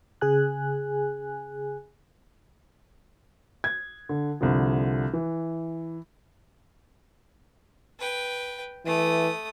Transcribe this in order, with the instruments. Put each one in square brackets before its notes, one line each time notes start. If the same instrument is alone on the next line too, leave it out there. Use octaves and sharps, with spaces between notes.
[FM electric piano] C#3 G#4 G#5 F#6
[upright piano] G#6
D3
C2 D3 F3
E3
[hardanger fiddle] B4 G5
[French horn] E3 [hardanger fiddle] A3 D#6